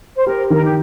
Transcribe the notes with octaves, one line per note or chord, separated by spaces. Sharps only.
C5
G4 A#4
D#3 A#4
G4